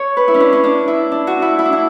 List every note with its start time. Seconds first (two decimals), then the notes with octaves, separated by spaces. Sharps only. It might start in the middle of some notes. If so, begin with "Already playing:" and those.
Already playing: C#5
0.17 B4
0.28 E4
0.34 C#4
0.40 D4
0.53 C#4
0.64 D4
0.88 E4
1.12 D4
1.27 F#4
1.42 E4
1.59 E4
1.65 D4
1.73 E4